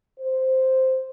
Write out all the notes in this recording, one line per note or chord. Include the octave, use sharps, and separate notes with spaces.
C5